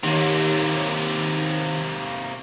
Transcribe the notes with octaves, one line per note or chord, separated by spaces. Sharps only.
D#2 C3 A#3